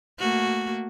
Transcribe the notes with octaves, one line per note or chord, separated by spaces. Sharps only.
A3 A#3 F#4